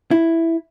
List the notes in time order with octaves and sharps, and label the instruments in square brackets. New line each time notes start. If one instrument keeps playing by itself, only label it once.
[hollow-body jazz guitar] E4